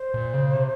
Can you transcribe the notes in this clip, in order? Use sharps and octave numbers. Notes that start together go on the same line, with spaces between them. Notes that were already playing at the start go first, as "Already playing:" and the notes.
Already playing: C5
A#2
C#3
C3